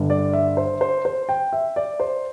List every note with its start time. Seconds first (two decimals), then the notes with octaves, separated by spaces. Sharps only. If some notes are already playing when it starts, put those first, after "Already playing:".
Already playing: G1 G2 D3
0.10 D5
0.33 E5
0.57 C5
0.81 C5
1.05 C5
1.29 G5
1.53 E5
1.76 D5
2.00 C5